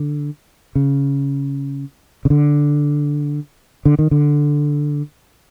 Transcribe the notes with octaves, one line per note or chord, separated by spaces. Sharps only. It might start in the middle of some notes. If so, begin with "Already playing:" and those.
Already playing: D3
C#3
C#3
D3
D3
D#3
D3